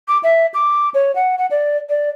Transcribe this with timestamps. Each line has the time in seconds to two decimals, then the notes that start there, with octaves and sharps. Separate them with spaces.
0.08 D6
0.23 E5
0.54 D6
0.94 C#5
1.15 F#5
1.38 F#5
1.51 D5
1.89 D5